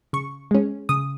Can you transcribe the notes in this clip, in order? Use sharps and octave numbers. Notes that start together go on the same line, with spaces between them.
C#3 C#6
G#3 C#4
C#3 D#6